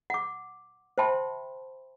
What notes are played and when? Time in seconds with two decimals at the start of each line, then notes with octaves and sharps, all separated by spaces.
0.10 F#5 D6
0.98 C5 E5 G5 A5 B5 C6